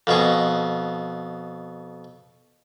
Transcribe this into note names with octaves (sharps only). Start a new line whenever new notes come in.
F2 B2 G#4